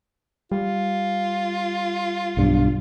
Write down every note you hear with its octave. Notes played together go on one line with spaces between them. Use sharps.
G3 F4
B1 G2